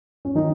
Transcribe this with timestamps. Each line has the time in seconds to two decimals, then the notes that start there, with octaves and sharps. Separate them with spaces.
0.25 C#4
0.35 D#3 D#4